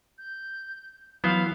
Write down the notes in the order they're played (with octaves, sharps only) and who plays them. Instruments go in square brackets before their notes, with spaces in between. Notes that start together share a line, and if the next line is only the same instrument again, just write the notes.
[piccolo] G6
[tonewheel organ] E3 [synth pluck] F#3 [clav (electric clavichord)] B3 C5 [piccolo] F5